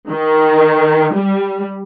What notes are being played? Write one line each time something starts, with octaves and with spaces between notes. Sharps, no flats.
D#3
G3